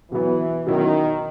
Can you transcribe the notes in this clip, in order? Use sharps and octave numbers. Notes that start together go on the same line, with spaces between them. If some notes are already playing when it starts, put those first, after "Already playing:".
B2 E3 F#3 B3
B2 D#3 F#3 C#4 E4